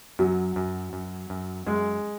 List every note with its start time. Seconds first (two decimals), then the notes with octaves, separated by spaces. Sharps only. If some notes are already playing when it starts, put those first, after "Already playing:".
0.19 F#2 F#3
0.56 F#2
0.93 F#2
1.30 F#2
1.66 F#2 G#3